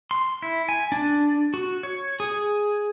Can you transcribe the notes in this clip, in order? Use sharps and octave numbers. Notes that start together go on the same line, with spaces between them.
C6
E4
G#5
D4
F#4
C#5
G#4